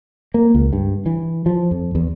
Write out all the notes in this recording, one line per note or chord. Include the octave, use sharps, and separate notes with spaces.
A#3
C#2
G2
E3
F3
F2
E2